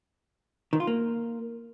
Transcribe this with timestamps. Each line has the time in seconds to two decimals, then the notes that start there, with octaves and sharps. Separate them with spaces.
0.73 D#3
0.80 F4
0.87 A#3